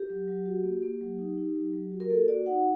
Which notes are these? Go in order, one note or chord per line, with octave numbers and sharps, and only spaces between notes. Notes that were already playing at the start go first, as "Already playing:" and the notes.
Already playing: G4
F#3
F#3
F#4
A#3
A#3
F#3
D#4
D#4
F#3
F#3
F#4
A#4
A#3 A4
F#4 D5
D#4 F#5